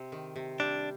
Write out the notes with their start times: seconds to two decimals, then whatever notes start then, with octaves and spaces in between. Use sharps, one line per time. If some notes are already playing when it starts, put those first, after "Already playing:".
Already playing: C3
0.12 D#3
0.36 C3
0.60 G3 D4